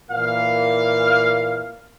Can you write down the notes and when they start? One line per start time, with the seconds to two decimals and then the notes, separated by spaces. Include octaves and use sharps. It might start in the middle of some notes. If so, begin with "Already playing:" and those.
0.11 A#2 E3 A#3 F5